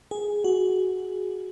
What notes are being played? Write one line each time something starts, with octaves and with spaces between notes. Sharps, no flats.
G#4
F#4